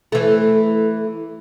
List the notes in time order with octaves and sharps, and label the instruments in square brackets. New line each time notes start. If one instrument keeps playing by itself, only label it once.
[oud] E3 A3